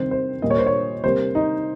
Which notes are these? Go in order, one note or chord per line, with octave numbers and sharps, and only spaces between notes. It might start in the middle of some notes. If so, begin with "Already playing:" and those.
Already playing: C3 D#3 G3 C4 C5
C5
A#2 G3 A#3 D#5
C#5
C5
C#5
C3 G3 A#3 C5
D#4